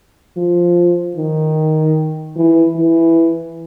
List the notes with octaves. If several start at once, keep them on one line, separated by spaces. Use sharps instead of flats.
F3
D#3
E3
E3